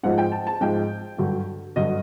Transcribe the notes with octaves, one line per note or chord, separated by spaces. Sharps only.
G#2 F3 G#3 F#5
G5
A5
A5
G#2 F3 G#3 G5
G2 D3 F#3
G2 D3 F#3 D#5